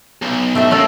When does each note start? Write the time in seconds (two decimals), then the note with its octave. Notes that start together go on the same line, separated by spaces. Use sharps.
0.22 B1
0.55 A3 G4 E5
0.71 F#3 A3 A#3 C#4 A4